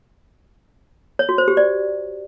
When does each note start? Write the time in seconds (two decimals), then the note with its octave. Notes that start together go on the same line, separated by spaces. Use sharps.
1.19 C#5
1.29 F#4
1.38 C5
1.48 G4
1.57 D5